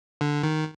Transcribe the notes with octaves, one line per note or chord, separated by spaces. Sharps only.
D3
D#3